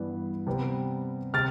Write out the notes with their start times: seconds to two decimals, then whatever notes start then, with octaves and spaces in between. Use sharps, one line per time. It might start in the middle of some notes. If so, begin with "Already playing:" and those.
Already playing: G2 E3 B3
0.47 C3 G3 B3
1.34 C3 F6 A6